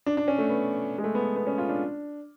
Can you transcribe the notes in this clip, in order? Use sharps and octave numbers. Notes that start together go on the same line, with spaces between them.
D4
D4
C#4
A3
B3
G#3
A3
B3
B3
C#4
F4
D4